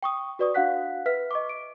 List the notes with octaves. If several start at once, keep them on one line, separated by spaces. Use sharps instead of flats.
G5 C#6 D#6
F#4 B4 D5 C#6 D#6
D4 F#4 F5 F#5 F#6 B6
B4 E5 F6 B6
D#5 C#6 D6
D7